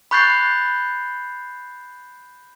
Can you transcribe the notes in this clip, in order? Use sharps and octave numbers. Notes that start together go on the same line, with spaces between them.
B5 C#6 F#6 G6 A6 C7